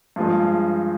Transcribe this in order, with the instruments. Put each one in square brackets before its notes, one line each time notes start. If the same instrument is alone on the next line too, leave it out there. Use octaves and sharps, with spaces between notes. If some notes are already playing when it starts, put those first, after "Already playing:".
[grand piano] G2 F3 G#3